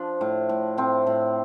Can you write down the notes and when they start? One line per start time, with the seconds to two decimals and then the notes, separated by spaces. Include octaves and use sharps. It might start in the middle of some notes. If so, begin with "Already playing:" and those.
Already playing: F3 D4
0.21 A2
0.49 A2
0.77 A2 C4
1.07 A2